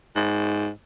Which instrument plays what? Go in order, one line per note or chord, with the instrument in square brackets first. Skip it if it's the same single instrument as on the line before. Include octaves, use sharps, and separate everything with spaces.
[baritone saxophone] G#2